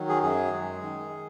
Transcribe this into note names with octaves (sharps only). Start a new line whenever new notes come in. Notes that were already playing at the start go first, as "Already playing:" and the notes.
Already playing: D#3 F#3
G#4
F#2 G#4
G#3
D#3